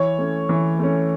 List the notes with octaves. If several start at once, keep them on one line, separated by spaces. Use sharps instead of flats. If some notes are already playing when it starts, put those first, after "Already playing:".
Already playing: E3 C#5
A3 C#4
E3
A3 C#4